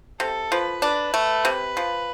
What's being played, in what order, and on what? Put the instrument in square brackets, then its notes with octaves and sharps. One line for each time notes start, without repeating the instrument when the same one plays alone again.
[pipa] C3 [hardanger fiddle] A4
[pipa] F3 [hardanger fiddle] B4
[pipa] D4 [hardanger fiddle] B4
[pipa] A3
C3
F3